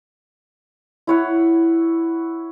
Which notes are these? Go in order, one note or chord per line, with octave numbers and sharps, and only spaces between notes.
E4 C#5 F#5